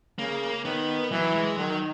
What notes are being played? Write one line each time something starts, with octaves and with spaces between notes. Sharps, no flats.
C#3 A#3
D#3 B3
E3 F#3
G#3
D#3 F#3